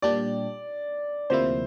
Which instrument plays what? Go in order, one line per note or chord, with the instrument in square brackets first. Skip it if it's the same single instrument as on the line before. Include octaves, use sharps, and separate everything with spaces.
[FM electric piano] A#2 G3 D4 G4 [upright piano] D5
[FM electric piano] D2 C3 F3 A#3 E4 [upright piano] C5